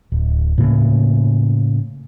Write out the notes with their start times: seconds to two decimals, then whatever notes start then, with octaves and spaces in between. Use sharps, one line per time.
0.12 D1
0.58 A2 C#3 A#3